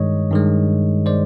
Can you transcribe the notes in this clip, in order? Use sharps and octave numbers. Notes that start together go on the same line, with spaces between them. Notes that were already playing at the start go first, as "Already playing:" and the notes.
Already playing: G2 D#3 G#3 C#5 D#5
G2 D#3 G#3
D#3 G#3 C5 D5